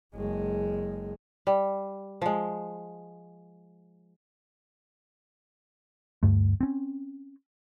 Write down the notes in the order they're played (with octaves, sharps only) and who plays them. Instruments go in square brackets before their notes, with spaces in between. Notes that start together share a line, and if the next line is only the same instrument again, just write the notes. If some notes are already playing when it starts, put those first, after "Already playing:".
[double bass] F#1 G#3
[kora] G3
F3 G#3
[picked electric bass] D2 G2 A3
C4 C#4